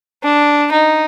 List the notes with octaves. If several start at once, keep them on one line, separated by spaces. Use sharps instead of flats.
D4
D#4